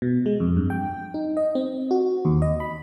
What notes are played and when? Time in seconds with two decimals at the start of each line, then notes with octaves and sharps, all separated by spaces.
0.02 B2
0.26 G#3
0.40 F2
0.57 G2
0.70 G5
1.14 D#4
1.37 D#5
1.55 C4
1.91 F#4
2.25 D#2
2.42 D#5
2.60 B5